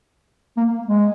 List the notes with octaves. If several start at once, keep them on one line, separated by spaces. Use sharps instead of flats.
A#3
G#3